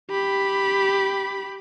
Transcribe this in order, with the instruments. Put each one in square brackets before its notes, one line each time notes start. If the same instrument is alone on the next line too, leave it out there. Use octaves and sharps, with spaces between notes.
[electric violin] G4 B5